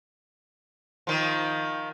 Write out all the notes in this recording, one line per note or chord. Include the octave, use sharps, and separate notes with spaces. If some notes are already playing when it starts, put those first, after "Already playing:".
D#3 F3